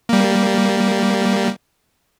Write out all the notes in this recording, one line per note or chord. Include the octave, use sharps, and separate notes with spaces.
G3 A#3